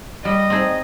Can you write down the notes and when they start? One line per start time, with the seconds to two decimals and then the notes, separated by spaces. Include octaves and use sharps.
0.25 G3 D#5
0.50 C4 D#4 G#4